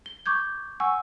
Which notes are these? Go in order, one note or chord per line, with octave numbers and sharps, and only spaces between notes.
G7
C#6 D6 G6 G#6
F#5 G#5 C#6 E6